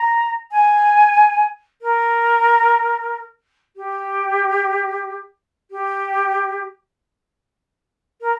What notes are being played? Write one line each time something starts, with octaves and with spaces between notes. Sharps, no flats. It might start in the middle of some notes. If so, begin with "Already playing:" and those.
Already playing: A#5
G#5
A#4
G4
G4
A#4